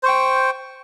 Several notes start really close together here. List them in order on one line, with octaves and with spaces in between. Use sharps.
C5 C#6 G5